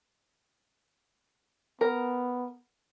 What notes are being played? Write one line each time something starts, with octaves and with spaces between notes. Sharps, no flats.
B3 A#4